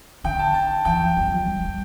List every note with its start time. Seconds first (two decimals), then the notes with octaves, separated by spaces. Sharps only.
0.24 D3 G5
0.39 A5
0.54 A5
0.85 E3 G5
1.00 F3
1.17 G3
1.31 F3
1.47 G3
1.64 G3